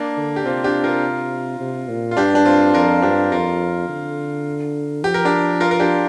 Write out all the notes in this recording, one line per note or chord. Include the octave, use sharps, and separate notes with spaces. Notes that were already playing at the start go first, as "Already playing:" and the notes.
Already playing: A#3 D4
D3
G4
C3 C4 F4
D4 G4
F4 A#4
C3
A#2
F4
G2 D4 G4
D4
C4 F4
F2 F4 A#4
G2 D4 G4
F2 F4 A#4
D3
F3 G4
A#4
D4 G4
F4 A#4
A#4
D4 G4